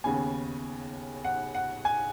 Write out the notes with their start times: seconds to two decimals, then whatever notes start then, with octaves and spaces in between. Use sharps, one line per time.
0.04 D#2 C#3 B3 G#5
1.25 F#5
1.55 F#5
1.85 G#5